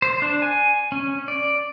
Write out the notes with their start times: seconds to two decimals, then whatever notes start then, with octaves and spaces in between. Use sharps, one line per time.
0.02 C5
0.22 D4
0.42 G#5
0.92 C#4
1.28 D5